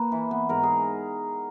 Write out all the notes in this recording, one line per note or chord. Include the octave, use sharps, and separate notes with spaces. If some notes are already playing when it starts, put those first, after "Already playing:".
Already playing: A#3 B4
E3
B3
G#2 A#4
G#4